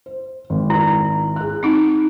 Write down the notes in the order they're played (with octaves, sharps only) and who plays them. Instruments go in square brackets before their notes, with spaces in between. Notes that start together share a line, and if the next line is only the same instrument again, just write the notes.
[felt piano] C5
G#1
[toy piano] E4
[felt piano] G#4 F#6
[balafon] C4 D#4